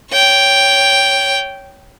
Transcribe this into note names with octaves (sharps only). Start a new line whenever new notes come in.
C#5 G5